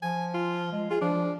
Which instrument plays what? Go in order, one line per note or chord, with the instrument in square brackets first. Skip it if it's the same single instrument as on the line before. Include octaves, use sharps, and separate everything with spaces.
[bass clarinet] F3 [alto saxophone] G#5
[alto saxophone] F4
[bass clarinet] G#3
[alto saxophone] F4 [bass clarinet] G#4
[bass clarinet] F3 [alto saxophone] D4